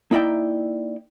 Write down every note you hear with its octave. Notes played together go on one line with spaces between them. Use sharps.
A#3 D#4 E4 D5 E5 G5